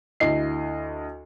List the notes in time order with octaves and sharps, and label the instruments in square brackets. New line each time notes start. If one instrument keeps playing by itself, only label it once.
[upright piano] D2 E4 D#5 C7